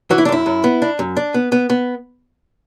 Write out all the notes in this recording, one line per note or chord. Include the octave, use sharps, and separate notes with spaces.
E3 F#4
E4
D4
F#2 E4
F#2
B3
D4
F#2
D4
B3
B3
B3